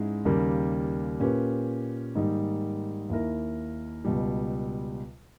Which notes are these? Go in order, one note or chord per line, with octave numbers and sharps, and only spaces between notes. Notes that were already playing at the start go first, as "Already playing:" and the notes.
Already playing: G#2 G#3 C#4 E4
D#2 C#3 G3 A#3
A#2 A#3 C#4 G4 B4
G#2 D#3 G3 A#3 D#4
D#2 D#3 A#3 E4 A#4
C#2 B2 G3